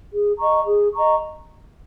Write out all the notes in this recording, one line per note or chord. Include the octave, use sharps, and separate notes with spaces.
G#4
D#5 A#5 C#6
G#4
D#5 A#5 C#6